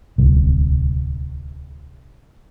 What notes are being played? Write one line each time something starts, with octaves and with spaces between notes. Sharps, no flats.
D1 C2